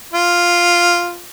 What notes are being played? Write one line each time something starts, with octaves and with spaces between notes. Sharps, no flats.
F4